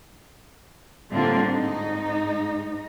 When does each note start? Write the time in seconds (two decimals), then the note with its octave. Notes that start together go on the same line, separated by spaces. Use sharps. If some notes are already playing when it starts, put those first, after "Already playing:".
1.12 A2 D3 G3 A#3 C4 F4
1.52 G#2 D#4